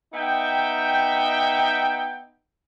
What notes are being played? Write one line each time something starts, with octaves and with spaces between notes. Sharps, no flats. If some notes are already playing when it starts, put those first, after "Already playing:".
B3 D#4 E5 G5